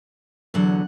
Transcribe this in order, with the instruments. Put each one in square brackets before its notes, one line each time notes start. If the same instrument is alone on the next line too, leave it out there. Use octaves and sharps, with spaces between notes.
[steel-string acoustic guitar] E2 D3 F#3 F#5